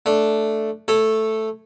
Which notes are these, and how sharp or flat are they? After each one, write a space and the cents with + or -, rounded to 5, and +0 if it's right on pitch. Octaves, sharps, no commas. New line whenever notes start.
A3 +0 D4 +0
A3 +0 A4 +0 C#5 -15